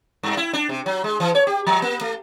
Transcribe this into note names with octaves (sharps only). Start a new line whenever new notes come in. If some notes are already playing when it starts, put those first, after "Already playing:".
G2
E4
D4
C3
F#3
G#3
E3
C#5
G4
F3
A#3
A3